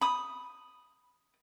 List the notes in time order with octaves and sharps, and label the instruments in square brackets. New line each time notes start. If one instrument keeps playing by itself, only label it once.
[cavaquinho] B5 D#6